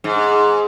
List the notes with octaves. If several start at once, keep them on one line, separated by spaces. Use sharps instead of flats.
G#2